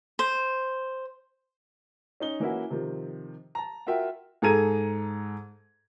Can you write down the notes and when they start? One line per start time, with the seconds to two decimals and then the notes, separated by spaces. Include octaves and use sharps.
0.19 C5
2.20 C#4 D#4 G7
2.40 E3 A#3 C#4 E4 F#4
2.70 C3 D#3 F3
3.55 A5 A#5
3.87 F4 F#4 A#4 E5 G5
4.42 G#2 G#4 A4 A#5 G#6 D#7